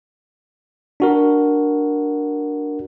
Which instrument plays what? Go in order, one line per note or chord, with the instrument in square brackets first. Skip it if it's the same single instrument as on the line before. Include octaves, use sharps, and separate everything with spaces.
[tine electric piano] D4 F#4 A#4